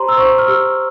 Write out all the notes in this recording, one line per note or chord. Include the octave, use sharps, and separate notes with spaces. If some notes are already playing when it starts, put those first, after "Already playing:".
Already playing: G4 C5 A#5 C6
E6
C5 C#6
F6
G4 E6